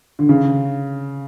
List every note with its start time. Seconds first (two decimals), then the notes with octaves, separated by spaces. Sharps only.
0.19 D3
0.29 C#3